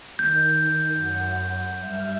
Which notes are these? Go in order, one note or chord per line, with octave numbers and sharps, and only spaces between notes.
D#3 G6
F#2 F#5
G2 E5 F6